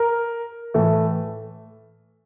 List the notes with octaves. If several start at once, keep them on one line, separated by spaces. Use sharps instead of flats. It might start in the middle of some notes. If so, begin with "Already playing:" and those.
Already playing: A#4
A2 E3 A3